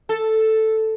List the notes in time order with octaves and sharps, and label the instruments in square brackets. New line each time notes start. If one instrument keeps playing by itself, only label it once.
[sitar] A4